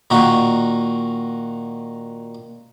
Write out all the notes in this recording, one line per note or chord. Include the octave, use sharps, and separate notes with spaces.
A#2 D#3 D#4 F#4